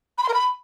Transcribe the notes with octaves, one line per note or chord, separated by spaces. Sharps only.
B5
C6
A#4
B5